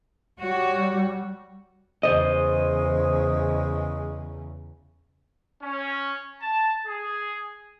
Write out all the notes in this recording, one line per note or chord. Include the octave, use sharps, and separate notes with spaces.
G3 F#4 C#5
E2 C#3 G#3 C5 D#5
C#4
A5
G#4